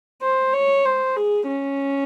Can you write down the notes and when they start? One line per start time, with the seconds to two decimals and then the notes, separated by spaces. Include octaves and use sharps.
0.22 C5
0.53 C#5
0.85 C5
1.16 G#4
1.47 C#4